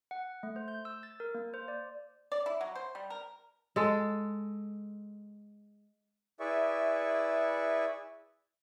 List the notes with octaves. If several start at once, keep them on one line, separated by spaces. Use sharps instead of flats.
F#5
A3
C5
G6
E6
A6
A#4
A#3
C5
D5
D5
E4
F#3
C5
G3
A#4
G#3 A4
E4 G#4 B4 D5 E5 C#6